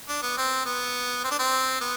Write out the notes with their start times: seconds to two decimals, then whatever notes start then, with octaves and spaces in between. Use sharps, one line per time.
0.09 D4
0.22 B3
0.37 C4
0.66 B3
1.24 C4
1.31 D4
1.39 C4
1.81 B3